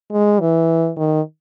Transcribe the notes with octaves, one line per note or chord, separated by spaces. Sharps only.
G#3
E3
D#3